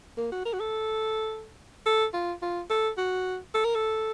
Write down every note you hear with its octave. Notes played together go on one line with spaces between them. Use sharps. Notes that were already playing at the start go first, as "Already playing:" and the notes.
A#3
F#4
A#4
F#4
A4
A4
F4
F4
A4
F#4
A4
A#4
A4